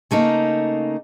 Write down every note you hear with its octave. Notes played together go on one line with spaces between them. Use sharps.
C#3 A3 A#3 D#4